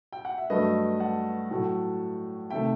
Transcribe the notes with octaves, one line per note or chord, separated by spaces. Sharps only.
G5
F#5
E5
G2 F#3 A3 B4 D#5
F#5 A5
A2 F#3 A3
C3 D#3 A3 E5 G5